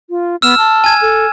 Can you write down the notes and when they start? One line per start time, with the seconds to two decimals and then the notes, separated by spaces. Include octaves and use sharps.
0.10 F4
0.42 B3 E6 F6 E7
0.58 A5
0.84 G#5 G#6
1.01 A4